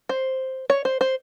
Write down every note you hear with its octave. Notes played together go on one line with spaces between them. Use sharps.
C5
C#5
C5
C5